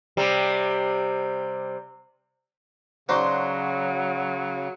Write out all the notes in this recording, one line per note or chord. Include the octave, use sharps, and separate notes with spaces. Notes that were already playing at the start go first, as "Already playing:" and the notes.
C3 G3
C#3 F#3 D4 D#4 F#4 C5 C6